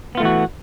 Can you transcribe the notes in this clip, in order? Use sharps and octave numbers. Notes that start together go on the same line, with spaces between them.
E3 A3 B3 F4 F#4